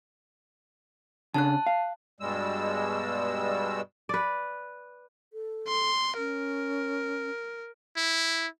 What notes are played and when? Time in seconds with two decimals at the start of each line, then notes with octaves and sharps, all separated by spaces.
1.34 C#3 D4 A5 F#6
1.66 F5
2.20 G2 B2 G3 G#3 E6
4.09 B4 D5
5.33 A4
5.67 C6
6.17 C#4 A#4
7.97 E4